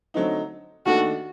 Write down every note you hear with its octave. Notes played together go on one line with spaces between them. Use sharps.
D3 F#3 A3 C4 D#4
D#2 D#3 A3 D4 F#4 A4